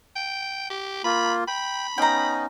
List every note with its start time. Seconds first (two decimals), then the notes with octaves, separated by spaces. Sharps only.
0.16 G5
0.70 G4
1.04 A#3 F4 B5
1.48 G5 B5
1.98 B3 C#4 D#4 G5 A#5